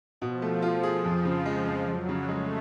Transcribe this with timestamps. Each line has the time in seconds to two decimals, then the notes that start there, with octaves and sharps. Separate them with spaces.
0.21 B2 F3
0.42 A3
0.62 F4
0.83 G#4
1.04 F2 F3
1.25 C#3
1.46 G#3
1.67 F2
1.87 F2 F#3
2.09 C#3
2.29 G#3 A3